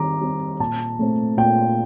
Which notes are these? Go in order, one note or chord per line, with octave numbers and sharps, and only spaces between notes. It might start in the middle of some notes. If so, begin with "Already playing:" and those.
Already playing: D#3 G3 C4 A#5 D6
G3 C4
A#2 A5
A3 C4
A#2 G5